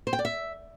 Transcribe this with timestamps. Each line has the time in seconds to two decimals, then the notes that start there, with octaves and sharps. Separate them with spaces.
0.07 C5
0.13 G5
0.19 D5
0.25 E5